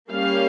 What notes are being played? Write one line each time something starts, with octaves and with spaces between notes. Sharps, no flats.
G3 A#3 C#4 F5